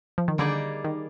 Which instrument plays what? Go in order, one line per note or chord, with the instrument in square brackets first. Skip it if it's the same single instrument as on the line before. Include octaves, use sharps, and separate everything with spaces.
[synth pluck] F3
D#3
[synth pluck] D3 [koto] G3 A#3 D#4 G#4 D5
[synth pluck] D#3